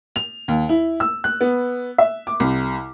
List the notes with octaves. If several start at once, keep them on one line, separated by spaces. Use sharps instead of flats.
F7
D#2
E4
E6
F#6
B3
E5
D6
C2